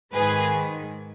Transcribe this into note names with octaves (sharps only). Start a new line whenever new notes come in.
G#2 D#3 G#3 G#4 B4